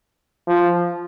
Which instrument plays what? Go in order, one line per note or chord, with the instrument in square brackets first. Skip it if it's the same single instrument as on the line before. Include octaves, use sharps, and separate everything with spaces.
[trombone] F3